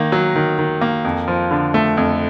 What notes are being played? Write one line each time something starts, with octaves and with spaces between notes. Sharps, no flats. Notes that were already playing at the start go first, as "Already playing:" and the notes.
Already playing: D#3 A#3
F#3
D#3
D#3
A#3
F2
F3
D3
A3
F2